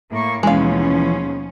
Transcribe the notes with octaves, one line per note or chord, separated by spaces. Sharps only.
A2 A#3 C#6
D#2 B2 E3 F3 G#3 C#4 F5